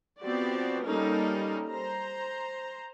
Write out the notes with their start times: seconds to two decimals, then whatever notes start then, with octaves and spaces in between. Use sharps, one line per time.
0.20 F3 B3 C4 F#4 G4 D5
0.84 G3 A#3 C#4 D#4 A4 A#4
1.70 C5 A#5